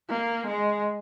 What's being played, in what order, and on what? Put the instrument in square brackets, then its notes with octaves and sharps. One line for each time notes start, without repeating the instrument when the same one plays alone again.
[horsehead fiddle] A#3
G#3